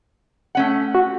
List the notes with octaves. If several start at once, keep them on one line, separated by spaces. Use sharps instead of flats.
A3 C#4 F#5
F#4